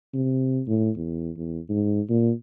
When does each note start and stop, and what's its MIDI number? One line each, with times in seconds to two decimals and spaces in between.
0.14 0.61 48
0.67 0.90 45
0.97 1.30 40
1.37 1.60 40
1.69 2.01 44
2.09 2.31 46